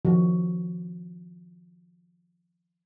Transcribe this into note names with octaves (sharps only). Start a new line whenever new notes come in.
D#3 F3 F#4